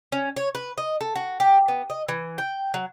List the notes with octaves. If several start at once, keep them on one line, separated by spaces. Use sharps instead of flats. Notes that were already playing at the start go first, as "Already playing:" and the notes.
C#4
C#5
B4
D#5
A4
F#4
G4
B3
D#5
E3
G5
F#3